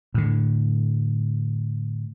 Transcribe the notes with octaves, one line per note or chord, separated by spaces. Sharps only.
A2 D3